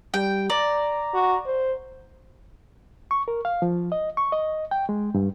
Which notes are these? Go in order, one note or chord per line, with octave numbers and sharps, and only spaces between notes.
G3 G5
D5 A#5
F#4
C5
C#6
A#4
F5
F3
D#5
C#6
D#5
G5
G#3
G2